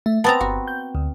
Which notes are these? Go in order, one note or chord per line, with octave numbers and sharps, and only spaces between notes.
A3 E5
B3 C4 A5 A#5 A6
G1 F#4
G6
D2